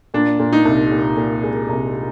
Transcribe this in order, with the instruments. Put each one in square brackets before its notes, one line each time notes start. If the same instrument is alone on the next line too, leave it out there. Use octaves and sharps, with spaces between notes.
[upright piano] A#2 [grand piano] D4
[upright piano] A#2
[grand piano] D#4
[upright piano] C2
A#2
A#2
G#3
C2